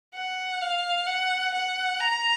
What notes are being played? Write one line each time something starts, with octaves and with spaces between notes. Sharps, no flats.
F#5
F5
F#5
F#5
A#5